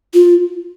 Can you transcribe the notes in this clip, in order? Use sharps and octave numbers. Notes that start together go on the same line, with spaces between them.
F4